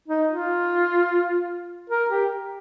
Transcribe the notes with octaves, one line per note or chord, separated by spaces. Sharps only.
D#4
F4
A#4
G4